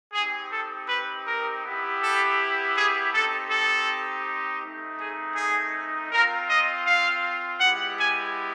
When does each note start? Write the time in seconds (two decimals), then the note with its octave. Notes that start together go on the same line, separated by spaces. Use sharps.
0.13 C4 D#4 G4 G#4
0.51 A4
0.88 B4
1.26 A#4
1.64 B3 E4 G4
2.01 A4
2.76 G#4
3.13 C4 D#4 G4 A4
3.50 A4
4.62 A3 C4 D#4
4.99 G#4
5.36 G#4
6.11 C4 F4 A#4
6.49 D#5
6.85 F5
7.60 G#3 B3 E4 G4 F#5
7.98 G#5